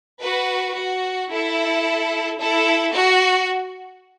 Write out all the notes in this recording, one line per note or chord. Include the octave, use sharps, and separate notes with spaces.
F#4 B4
F#4
E4 A4
E4 A4
F#4